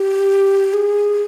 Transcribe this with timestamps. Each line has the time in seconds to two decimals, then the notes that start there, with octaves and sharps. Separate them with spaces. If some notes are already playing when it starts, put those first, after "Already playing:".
Already playing: G4
0.73 G#4